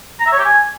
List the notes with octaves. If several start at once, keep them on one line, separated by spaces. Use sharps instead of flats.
A#5
E5
C#5
G4
G#5